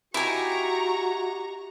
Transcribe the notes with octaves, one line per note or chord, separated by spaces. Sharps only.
D#4 E4 F#4 G4 G#5 A#5 C#6